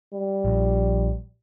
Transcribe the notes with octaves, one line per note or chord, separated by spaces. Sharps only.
G3
A#1